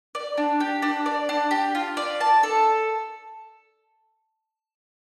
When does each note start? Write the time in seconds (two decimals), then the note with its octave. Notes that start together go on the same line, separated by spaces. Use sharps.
0.15 D5
0.37 D4
0.60 G4
0.82 D4
1.06 D5
1.29 D4
1.51 G4
1.75 F4
1.97 D5
2.20 A5
2.43 A4